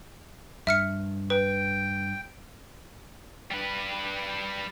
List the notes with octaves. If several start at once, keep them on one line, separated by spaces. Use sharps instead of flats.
G2 E5 F6 C#7
B4 G5
G3 B4